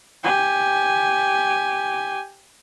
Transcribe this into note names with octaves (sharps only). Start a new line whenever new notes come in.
G4 G#5